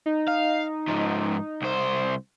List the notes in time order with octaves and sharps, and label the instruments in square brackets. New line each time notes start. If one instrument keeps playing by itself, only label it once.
[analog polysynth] D#4
[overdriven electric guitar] F5
G#2 F3
C2 C5